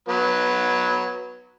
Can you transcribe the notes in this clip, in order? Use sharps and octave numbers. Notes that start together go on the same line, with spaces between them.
F#3 B3 B4